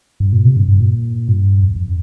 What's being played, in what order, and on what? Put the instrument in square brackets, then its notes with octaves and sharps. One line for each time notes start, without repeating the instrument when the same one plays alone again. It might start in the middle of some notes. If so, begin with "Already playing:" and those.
[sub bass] G2
A#2
C3
G2
G2
A#2
G2
F2
F2